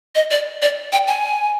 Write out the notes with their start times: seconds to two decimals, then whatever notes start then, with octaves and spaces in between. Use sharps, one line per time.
0.15 D#5
0.31 D5
0.62 D5
0.93 G5
1.08 G#5